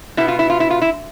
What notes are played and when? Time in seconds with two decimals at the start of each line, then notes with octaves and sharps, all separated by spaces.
0.17 B2 B3 E4
0.28 F4
0.39 E4
0.50 F4
0.60 E4
0.70 F4
0.82 E4